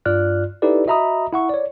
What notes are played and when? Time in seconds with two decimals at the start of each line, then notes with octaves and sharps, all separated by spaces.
0.05 G2 F4 D5 F6 F#6
0.62 D#4 E4 G4 A4 B4 D5
0.87 F#4 D#5 E5 A#5 B5 D#6
1.33 E4 F#5 C#6
1.49 C#5 D5